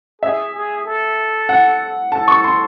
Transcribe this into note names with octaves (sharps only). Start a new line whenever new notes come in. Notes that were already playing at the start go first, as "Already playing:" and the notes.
G#4 E5
G#4
A4
F#5
A4 A5
C#6
C6